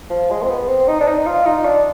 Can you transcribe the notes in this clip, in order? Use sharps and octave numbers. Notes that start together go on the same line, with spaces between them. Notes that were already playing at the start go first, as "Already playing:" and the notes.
F3
G#3
C4
B3
C4
D#4
D4
D#4
F4
D#4
D4